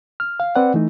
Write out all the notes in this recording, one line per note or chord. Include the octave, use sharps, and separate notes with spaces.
F6
F5
C4 B4 D5 F#5
E3 A3 D#4